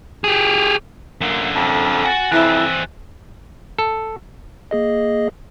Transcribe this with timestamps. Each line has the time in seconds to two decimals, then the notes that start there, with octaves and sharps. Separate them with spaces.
0.24 G4 G#4
1.21 F#2 A#2 D3
1.55 F2
2.05 F#4 F#5 G#5 A6
2.32 F2 E3 C4 E4 F#6
3.78 A4
4.71 A#3 G#4 D#5